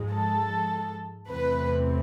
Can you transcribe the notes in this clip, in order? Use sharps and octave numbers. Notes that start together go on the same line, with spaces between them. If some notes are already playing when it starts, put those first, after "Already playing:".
Already playing: G#2 F3 G#3
A4
E2 C3 E3 A3 C4 B4